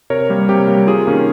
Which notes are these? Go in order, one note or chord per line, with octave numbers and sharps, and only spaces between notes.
C3 A#4 C#5
G3 A#3
C3 G4
G3 A#3
C3 F4 G#4
D#3 A#3 C#4